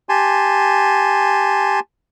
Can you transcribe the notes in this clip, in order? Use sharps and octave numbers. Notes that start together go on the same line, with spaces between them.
G4 G#5 A5 C6